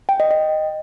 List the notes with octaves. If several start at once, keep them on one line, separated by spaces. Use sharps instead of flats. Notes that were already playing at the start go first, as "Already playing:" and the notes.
G5
D#5
D#5